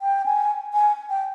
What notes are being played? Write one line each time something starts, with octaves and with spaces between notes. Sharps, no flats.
G5
G#5
G#5
G5